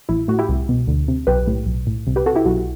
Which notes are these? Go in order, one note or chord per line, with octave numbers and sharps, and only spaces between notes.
A1 E4
A2 F#4
E4 G4
C2
B2
D2
C3
B1 G4 B4
A2
B1
A2
C2
G4 B4
C3 F#4 A4
E4 G4
B1 F#4